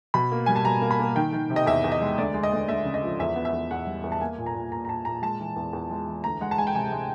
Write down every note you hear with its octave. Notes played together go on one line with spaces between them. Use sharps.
B2 B5
A#3
G3 G#5
A5
B2 A#5
A#3
B5
A#3
D#3 G5
D#3
C3
D#5
E2 E5
E2
D#5
G#3
D2 D5
G#3
D#5
D2
D2 E5
C#3
D#5
F3
E2 E5
B3
E5
E2
E2 F#5
G3
E2
A5
A#3 G#5
A#2
A#5
A#2
A#2 A#5
A#5
A#2 A5
A#2 A#5
G#3 A5
E3
E2
E2
G#3
E3
D2 A#5
G#3 F#5
A5
G#3 G#5
G5
C3 G#5
G#3